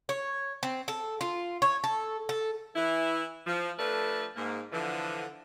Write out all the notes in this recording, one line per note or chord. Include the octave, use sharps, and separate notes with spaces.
C#5
C4
A4
F4
C#5
A4
A4
E3 E4
F3
F3 A3 D4 A4 B4
G#2 A#3
D3 E3 F3